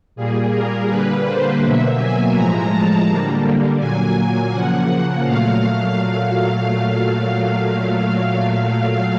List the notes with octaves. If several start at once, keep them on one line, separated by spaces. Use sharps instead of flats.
A#2 G3 A#3 G#4
A#4
D3 G3 A#3 B4
C5
B2 F#3 A#3 E5
G#5
A2 F3 G#3 A#5
A5
D3 G3 A#3
A#2 F#3 A#3 G#5
C#3 F3 A#3 F#5
A#2 F#3 A3 F5